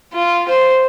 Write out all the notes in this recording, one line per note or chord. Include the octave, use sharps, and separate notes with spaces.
F4
C5